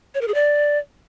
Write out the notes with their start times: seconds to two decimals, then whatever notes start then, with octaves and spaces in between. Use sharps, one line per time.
0.15 C#5
0.21 A#4
0.28 G#4
0.34 D5